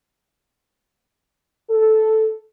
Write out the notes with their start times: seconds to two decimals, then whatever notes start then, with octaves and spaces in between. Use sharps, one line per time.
1.71 A4